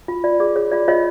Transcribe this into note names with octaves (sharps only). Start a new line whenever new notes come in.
F4
F4 D5
G#4 D5
G#4 C#5
F4 D5
F4 C#5 D#5